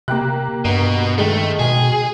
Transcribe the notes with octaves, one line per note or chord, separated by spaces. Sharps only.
C3 A#3 G4 F#6
G2 B2
D#3 G#3 A3
B2 G#4